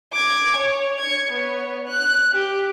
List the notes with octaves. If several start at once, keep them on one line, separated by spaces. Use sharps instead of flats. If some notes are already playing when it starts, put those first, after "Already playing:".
D6 G#6
C#5
G#6 C#7
B3 C#5
F#6
G4